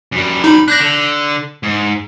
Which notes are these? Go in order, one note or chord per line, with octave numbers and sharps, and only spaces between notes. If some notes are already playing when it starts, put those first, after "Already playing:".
F#2 G3
D#4 B5
D4 F#6 G6 A#6
D3
G#2